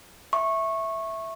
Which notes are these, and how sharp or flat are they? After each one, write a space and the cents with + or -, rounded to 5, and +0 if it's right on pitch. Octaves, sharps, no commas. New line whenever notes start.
E5 +0 C#6 -15